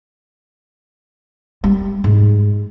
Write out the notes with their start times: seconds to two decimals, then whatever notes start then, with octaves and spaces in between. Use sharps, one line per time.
1.64 G3
2.04 G#2